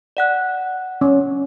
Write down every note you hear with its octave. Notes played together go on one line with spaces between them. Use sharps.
D5 F#5 F#6
C#4